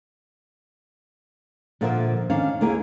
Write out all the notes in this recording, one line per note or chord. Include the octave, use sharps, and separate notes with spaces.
A#2 D3 F3 F#4 A#4 E5
D#3 C#4 D4 F5
D#2 D3 A#3 E4 G#4 G#5